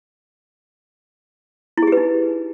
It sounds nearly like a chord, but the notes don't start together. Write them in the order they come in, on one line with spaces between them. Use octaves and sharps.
E4 G#4 G4 B4 D#4